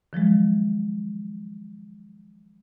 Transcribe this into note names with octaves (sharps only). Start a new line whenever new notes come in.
D#3 F3 F#3 G#3